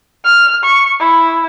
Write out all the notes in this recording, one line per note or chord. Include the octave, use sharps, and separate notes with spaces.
F6
C#6
E4